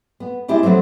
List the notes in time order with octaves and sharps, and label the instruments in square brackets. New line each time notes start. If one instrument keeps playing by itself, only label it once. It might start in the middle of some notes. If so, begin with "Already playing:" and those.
[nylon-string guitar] B3
G#3 D4 E4 G4 G#4
F3 F#3 G#3 A3 C4